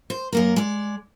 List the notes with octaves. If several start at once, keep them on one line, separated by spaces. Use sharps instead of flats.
C5
F#2 A#3 A#4
G#3 D5